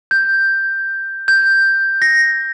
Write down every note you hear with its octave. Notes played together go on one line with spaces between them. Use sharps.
G6
G6
A#6